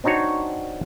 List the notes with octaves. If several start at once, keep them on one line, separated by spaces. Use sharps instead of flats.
C4 D4 D#4 F#4 C#5